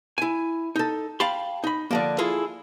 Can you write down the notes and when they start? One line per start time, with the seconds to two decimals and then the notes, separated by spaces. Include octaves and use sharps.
0.18 E4 G#5
0.76 D#4 A4
1.20 F5 G5 A5 B5 C6
1.64 D#4 B5
1.91 D3 F3 A#3
2.18 E4 F4 G#4 A4